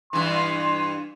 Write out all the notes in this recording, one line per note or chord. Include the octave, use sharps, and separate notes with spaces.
G2 E3 C6